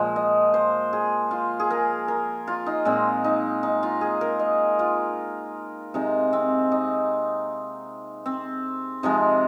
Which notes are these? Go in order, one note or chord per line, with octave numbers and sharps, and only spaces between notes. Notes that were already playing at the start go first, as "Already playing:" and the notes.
Already playing: A#2 F3 G#3 C5
D#5
C5
G#4
F4
G#4
A#4
A#4
F4
D#4
A#2 G#3 C4
D#4
D#4
F4
G#4
A#4
D#5
F4
C3 G#3 D#4
C4
D#4
C4
C3 F3 G#3 D#4